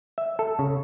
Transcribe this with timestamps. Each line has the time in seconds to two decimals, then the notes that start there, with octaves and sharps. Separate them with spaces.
0.18 E5
0.39 A4
0.59 C#3